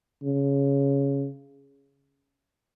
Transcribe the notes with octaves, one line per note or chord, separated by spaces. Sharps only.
C#3